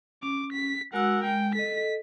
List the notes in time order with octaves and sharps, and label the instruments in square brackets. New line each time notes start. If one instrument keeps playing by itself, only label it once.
[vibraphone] C#4 [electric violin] D6
[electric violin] B6
[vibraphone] G#3 F#4 E6 [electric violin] A#4 F#5
[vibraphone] G#3 [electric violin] G5
[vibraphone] A4 D#5 [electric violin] B6